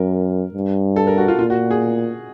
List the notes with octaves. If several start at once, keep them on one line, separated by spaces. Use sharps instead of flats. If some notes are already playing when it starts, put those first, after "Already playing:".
Already playing: F#2 A#4
G2
A4
A#4
F#4
F4
A#2 F4
F#4
G#4